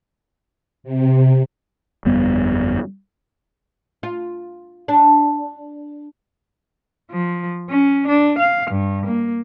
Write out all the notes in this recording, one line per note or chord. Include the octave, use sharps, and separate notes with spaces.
C3
G1 F2 G3 B3
F4
D4
F3
C#4
D4
F5
G2
A#3